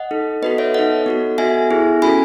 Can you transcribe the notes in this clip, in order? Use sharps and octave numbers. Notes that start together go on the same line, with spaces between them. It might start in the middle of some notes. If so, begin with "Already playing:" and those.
Already playing: D#5 F#5
D#4 A4
B3 F#4 A4 B4 D#5
C#5 E5
D#4 A4 D#5 F#5
B3 F#4 A4
B3 F#4 A4 E5 G#5
B3 E4 G#4
C#4 F#4 A4 G#5 B5